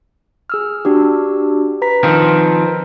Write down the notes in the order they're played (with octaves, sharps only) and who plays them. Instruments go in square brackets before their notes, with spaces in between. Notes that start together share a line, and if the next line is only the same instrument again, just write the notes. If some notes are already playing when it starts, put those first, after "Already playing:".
[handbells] G#4 E6 F6
D4 F#4 G4
B4 A#5 B6
[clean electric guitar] D#3 F3 C4